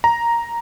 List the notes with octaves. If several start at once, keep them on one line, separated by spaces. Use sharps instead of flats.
A#5